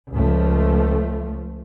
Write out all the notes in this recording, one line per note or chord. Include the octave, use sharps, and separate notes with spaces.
C#2 F3 A3